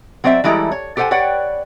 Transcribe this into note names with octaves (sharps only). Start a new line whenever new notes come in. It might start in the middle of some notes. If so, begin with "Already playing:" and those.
F#3 C4 C5 D5 E5
E3 G3 G#3 E4 A4 A#5
C#5
G4 A4 C5 F5 F#5 G#5
B4 C#5 D5 F#5 G5